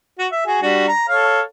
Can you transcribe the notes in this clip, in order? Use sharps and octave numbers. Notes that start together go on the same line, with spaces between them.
F#4
E5
F#4 G#4
G3 D4 F#4
A#5
A4 C#5 F5